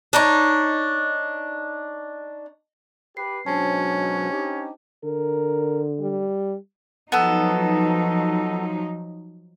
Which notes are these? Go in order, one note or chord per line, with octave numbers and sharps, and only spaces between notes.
D4 D#4 C#5
G4 B4 C7
G#2 B2 F#3 C#4 D4 C5 A5
D#4 G4
D3 A#4
G3
F3 F#3 B3 D#4 A4